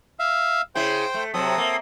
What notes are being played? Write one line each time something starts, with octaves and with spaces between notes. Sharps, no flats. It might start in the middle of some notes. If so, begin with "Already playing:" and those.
E5 F5
C#3 E4 C5 G5
A3
C3 F#3 C4 A4 D#6
A#3